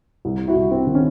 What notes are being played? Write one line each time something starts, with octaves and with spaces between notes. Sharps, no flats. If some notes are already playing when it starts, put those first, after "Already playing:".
C2
E4 F#4
C2
C4
D#3
C#4